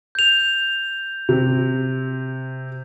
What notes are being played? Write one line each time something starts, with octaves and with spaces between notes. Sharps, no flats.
G6 F7
C3 C4